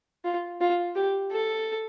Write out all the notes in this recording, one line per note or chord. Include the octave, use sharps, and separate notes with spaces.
F4
F4
G4
A4